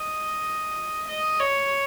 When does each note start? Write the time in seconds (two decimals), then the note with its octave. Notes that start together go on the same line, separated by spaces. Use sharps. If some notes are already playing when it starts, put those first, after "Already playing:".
Already playing: D#5
1.08 D#5
1.39 C#5